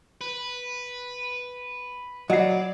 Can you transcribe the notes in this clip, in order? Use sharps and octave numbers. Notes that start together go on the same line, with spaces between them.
B4
F#3 D5 D#5 F#5 C7